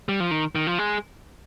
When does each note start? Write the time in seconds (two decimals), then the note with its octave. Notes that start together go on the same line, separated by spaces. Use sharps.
0.09 G3
0.20 F3
0.31 D#3
0.55 D#3
0.67 F3
0.78 G#3